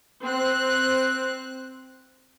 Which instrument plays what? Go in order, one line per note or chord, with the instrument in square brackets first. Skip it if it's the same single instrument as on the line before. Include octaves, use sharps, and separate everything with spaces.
[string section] C4 F#6